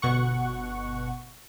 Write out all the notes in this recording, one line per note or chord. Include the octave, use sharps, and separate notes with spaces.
G1 B2 F#5 C#6